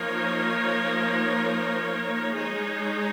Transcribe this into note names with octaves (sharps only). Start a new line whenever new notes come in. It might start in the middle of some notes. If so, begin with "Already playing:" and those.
Already playing: F3 A#3 D#4 A#4 C#5
G#3 D#4 G#4 C#5